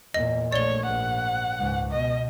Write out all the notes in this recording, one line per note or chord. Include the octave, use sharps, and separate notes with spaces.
E2 A#2 D#5
A#1 A3 C#5 D5 G7
A#1 G#2 F#5
C#2 G#2
B2 D#5